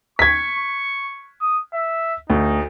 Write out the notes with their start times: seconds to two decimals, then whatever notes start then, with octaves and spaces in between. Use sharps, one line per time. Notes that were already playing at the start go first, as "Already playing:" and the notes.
0.19 C#6 G#6 B6
1.41 D#6
1.74 E5
2.30 D2 D#4